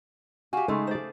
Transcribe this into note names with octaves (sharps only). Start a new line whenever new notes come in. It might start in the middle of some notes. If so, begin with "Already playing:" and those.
F#4 G4 F5 G#5
C#3 G#3 A3 D#4 G#4
C5 D5